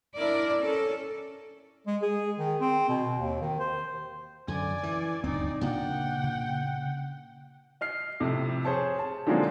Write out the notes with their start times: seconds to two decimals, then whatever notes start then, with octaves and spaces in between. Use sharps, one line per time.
0.15 D4 E4 A#4 D5
0.58 C#4 A4
1.87 G#3
2.02 G#4
2.39 D#3
2.60 C4
2.89 B2
3.18 D#2
3.41 D#3
3.59 C5
4.48 F#2 D3 D5 G#5
4.83 E3
5.24 D#1 D2 G2 C4 D#4 D5
5.61 A#2 C#3 D4 F#5 G5
6.24 C#3
7.81 D#5 F6 C7
8.20 F2 A2 C3
8.65 G#4 C5 C#5 A5
8.99 A5
9.27 D3 F3 F#3 G#3 A#3 C4